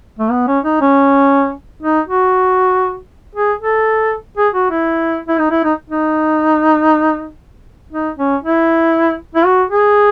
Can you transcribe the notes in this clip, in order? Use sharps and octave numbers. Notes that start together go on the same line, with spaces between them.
A3
B3
C#4
D#4
C#4
D#4
F#4
G#4
A4
G#4
F#4
E4
E4
D#4
E4
D#4
D#4
D#4
C#4
E4
E4
F#4
G#4